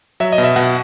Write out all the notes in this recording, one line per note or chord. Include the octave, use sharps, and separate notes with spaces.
F#3 E5
D#5
B2
E5
B2 F#5